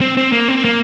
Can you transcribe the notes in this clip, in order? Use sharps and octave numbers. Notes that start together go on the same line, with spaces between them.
C4
C4
A#3
C4
A#3